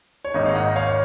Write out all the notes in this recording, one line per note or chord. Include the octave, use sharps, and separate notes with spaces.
C#5
G#1 G#2 D#3 A#3 D#4 D#5
F5
D#5 F#5
C#5 F5